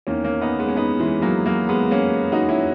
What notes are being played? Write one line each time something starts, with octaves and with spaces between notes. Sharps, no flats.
E2 D#3 A#3 C#4
A#3 C#4
B3 D#4
G#3 B3
C#4
B3 D#4
E3 G#3
F#3 A#3
F#3 A#3
G#3 B3
A#3 C#4
D#4 F#4
C#4 E4